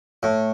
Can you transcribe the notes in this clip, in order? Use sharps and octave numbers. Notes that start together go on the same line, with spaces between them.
A2